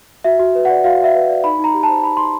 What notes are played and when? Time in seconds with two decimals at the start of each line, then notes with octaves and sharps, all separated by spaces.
0.24 F#4 E5
0.40 F#4
0.55 B4
0.65 D5 F#5
0.84 F#4 F5
0.99 F#4 E5
1.14 B4
1.29 D5
1.44 D#4 B5
1.59 D#4 A#5
1.74 G4
1.83 A5
1.89 C5
2.03 D#4 B5
2.17 D#4 C6